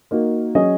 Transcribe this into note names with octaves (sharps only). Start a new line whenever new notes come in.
A#3 D#4 F#4
F#3 C#4 G#4 D#5